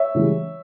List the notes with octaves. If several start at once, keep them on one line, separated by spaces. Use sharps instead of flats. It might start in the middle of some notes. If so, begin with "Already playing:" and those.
Already playing: C#5 E5
C#3 E3 G3